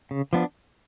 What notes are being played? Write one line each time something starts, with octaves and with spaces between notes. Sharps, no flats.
C#3
F3 B3 D4